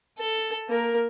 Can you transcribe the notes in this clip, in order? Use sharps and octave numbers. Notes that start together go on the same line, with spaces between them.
A4
A#3 A#4